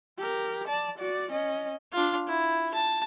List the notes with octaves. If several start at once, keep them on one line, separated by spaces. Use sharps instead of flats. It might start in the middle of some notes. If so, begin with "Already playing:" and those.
G4 A#4
D5 A5
F#4 D5
C#4 D#5
D4 F4
E4
A5